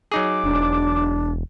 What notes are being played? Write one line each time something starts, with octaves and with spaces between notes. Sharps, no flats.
F#3 D#4 G#4 D6
E1 D4